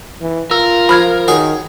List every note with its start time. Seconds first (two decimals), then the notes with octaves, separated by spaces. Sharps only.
0.21 E3
0.51 F4 A#4 E6
0.89 F3 B5 F6 G#6
1.28 D#3 F#4 G#4 C#5